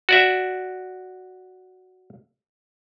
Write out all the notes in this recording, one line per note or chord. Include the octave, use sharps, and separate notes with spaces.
F#4 D5 E5